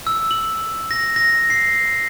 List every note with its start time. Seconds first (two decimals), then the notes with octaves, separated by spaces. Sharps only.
0.07 E6
0.31 F#7
0.91 A#6
1.16 A#6
1.50 C7